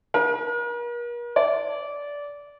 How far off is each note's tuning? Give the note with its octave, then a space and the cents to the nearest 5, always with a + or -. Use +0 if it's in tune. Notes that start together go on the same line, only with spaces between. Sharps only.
A#4 +40
D5 -20